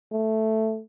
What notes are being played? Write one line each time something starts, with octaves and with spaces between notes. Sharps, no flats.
A3